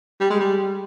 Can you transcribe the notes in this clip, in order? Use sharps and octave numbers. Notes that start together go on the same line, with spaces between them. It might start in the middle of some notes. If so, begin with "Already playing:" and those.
G3
G#3
G3